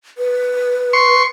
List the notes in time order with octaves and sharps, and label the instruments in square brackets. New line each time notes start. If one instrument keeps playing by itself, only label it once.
[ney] B4
[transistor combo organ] C6 C#6